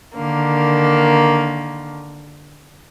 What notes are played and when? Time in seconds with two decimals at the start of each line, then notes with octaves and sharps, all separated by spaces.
0.16 D3 D#3 A#3